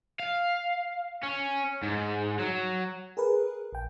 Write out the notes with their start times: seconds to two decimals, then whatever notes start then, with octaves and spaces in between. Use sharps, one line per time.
0.20 F5
1.23 C#4
1.83 G#2
2.40 F#3
3.17 G#4 A#4 B4
3.73 A#1 G5